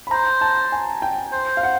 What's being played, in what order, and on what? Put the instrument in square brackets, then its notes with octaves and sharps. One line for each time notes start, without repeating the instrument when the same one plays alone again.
[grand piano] B5
[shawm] C5 [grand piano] A#5
[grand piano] A5
G#5
G5
[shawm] C5
[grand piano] F5
F#5